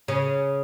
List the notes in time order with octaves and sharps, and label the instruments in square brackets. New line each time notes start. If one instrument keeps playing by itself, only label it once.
[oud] C#3